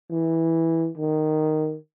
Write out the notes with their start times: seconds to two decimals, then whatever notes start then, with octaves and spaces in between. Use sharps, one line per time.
0.10 E3
0.98 D#3